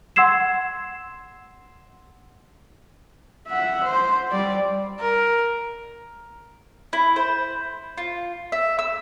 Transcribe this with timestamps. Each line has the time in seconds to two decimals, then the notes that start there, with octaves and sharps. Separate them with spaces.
0.16 F#5 C6 E6 G#6 C7 E7
3.48 E5 F#5
3.84 C5
4.31 G3 D5
5.00 A#4
6.93 E4
7.16 C5
7.98 F4
8.52 E5
8.79 E6